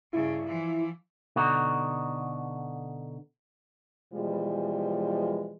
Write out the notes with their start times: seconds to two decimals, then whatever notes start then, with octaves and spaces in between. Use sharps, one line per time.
0.13 G2 C#3 E4
0.45 E3 F3
1.36 B2 D3 D#4 F#4
4.13 B2 E3 F3 G3 G#3